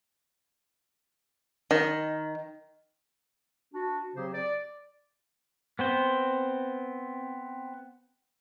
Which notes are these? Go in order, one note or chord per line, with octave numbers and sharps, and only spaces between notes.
D#3
D4 F#4
C#3 F#3 C4 G4 G#4 C5
D5
B3 C4 C5